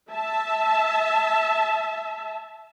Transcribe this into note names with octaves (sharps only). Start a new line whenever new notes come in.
E5 A5